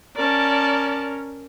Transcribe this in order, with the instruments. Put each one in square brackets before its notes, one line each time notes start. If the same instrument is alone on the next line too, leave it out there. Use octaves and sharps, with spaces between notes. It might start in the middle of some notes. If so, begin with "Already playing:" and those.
[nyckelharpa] C#4 A#4 [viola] D5 A5